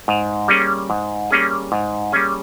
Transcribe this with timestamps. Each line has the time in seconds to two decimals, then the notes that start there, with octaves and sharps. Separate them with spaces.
0.08 G#2
0.48 G3 A#3 C#4 G#4
0.90 G#2
1.31 G3 A#3 C#4 G#4
1.72 G#2
2.12 G3 A#3 C#4 G#4